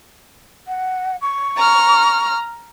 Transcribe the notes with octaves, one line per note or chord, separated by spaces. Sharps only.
F#5
C#6
A#5 F6